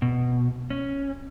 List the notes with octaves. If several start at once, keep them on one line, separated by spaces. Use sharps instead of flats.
B2
C#4